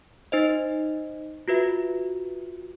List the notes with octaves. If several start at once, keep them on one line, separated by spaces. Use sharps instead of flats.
D#4 C5 D#5
F4 F#4 B4 E5